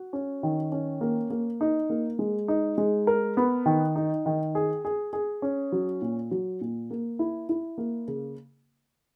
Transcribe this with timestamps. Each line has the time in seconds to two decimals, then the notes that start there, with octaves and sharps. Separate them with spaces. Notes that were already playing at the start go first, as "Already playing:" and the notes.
Already playing: F#4
0.13 C#4
0.43 D#3
0.72 C#4
1.01 A#3
1.30 A#3
1.61 D#4
1.90 A#3
2.19 G#3
2.48 D#4
2.78 G#3
3.07 A#4
3.37 B3
3.66 D#3
3.96 D#4
4.26 D#3
4.55 G#4
4.85 G#4
5.13 G#4
5.42 C#4
5.72 F#3
6.02 A#2
6.31 F#3
6.61 A#2
6.90 A#3
7.19 E4
7.49 E4
7.78 A#3
8.08 C#3